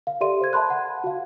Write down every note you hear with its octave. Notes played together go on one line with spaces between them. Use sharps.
F5
G4 A4 D5 E5 C6 D#7
C5 G#6
E5 A5 B5 C6 F#6
F#5
F#4 F5